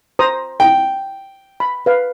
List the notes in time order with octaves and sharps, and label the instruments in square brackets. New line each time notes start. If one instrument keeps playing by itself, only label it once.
[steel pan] C5 A#5 D#6
[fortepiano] G5
[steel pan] B5
B4 F5